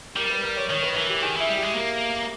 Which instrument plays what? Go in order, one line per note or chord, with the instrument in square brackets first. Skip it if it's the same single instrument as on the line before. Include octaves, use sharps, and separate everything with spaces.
[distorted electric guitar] G3 [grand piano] A#4
[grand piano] B4
A#4
C#5
[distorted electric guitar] D#3 [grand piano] C#5
[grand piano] B4
[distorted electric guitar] E3 [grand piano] A#4
[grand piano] G4
[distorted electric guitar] D#3 [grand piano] G#4
[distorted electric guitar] E3 [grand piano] E4
[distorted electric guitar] G3
[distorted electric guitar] G#3 [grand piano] G4
[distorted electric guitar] A#3 [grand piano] A#4